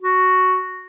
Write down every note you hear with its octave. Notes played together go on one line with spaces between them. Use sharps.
F#4